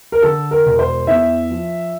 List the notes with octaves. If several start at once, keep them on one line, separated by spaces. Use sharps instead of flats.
A#4
D3 A4
A#4
E1
C5
E2 E5
F3